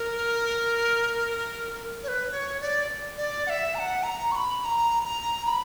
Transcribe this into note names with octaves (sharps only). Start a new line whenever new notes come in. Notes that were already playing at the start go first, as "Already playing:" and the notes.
Already playing: A#4
C#5
B4
C#5
D5
D5
F#5
E5
A#5
F#5
A#5
C#6
B5
B5
A#5
A#5
B5